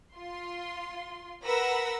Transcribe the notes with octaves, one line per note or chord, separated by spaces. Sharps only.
F4 C6
A#4 B4 F#5 B5 E6 A#6